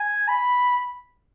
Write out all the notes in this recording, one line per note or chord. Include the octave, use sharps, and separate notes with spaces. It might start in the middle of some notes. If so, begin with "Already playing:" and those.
Already playing: G#5
B5